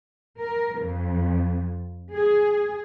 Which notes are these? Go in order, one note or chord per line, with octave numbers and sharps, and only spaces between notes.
A#4
F2
G#4